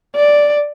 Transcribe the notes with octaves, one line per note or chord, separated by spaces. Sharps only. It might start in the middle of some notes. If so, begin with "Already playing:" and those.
D5